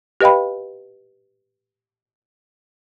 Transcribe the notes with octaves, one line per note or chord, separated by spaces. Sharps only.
G4 B4 D#5 F5 G5 B5